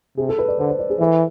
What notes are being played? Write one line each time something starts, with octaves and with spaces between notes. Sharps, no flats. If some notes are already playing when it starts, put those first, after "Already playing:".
C3 G#4
A4
B4
D5
D3 C5
C5
D5
G#4
E3 A4